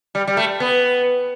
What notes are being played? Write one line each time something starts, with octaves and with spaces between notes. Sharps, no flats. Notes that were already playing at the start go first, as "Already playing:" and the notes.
G3
G3
A3
B3